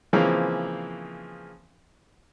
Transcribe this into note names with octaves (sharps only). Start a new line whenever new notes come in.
C#3 E3 F3 G#3 A#3 C4